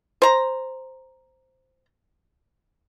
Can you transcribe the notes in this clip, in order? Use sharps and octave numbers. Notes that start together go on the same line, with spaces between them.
C5 A#5